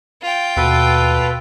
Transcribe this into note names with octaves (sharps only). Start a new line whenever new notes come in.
F4 G5
D#2 B2 A4 B4